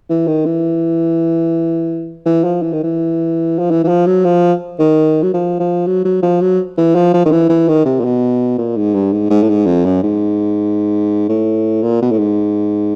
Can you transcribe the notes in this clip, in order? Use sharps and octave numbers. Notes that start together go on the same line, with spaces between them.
E3
D#3
E3
E3
F3
E3
D#3
E3
F3
E3
E3
F3
F#3
F3
D#3
F#3
F3
F3
F#3
F#3
F3
F#3
E3
F3
F3
D#3
E3
E3
D#3
C3
A#2
B2
A#2
G#2
G2
G#2
G#2
A2
G#2
F2
F#2
G#2
A2
A#2
B2
A2
G#2